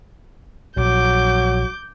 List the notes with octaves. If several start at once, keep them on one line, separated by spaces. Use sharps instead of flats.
A#1 F#3 D6 G6